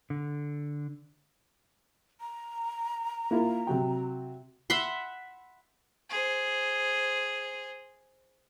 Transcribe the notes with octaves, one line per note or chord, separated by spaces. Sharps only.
D3
A#5
A#3 E4 F4
C3 F#3 G5
E5 F#5 B5 C6
G#4 C5